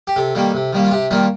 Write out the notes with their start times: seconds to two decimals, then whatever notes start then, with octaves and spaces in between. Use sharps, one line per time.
0.07 G4
0.16 C3 A4
0.35 D#3 G3 A#3
0.54 C3
0.73 D#3 G3 A#3
0.85 F4
0.91 C3 G4
1.11 D#3 G3 A#3 F4